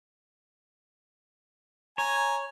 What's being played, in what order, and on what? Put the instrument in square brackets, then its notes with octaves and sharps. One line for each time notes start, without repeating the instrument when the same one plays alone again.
[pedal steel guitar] C#5 [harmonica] G#5 A#5